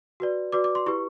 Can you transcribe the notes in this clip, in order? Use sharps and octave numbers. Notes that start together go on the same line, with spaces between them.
F#4 B4 D5
F#4 B4 D5 D6
D6
C6
E4 G4 B4 C#6